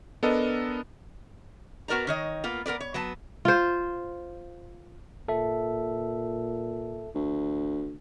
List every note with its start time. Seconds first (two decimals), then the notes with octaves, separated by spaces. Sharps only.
0.23 B3 D4 A4 A#4 D#5
1.88 B3 F#4 A#4 D5 A#5
2.07 D#3 C#5 D#5
2.44 A#3 B3 F4
2.66 B3 A#4 B4 D5
2.81 C#5
2.94 F#3 B3 A5
3.45 F4 C5
5.28 A#2 A4 E5
7.15 D2